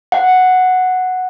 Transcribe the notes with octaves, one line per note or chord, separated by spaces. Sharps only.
F#5